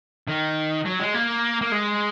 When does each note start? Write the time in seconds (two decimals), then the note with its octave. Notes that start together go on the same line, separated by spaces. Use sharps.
0.28 D#3
0.85 F#3
1.00 G#3
1.14 A#3
1.61 A#3
1.72 G#3